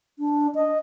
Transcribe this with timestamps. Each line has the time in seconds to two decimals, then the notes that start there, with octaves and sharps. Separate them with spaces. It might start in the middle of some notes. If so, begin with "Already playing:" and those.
0.19 D4
0.55 D#5